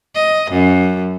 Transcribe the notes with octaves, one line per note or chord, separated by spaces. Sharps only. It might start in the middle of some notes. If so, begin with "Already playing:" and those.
D#5
F#2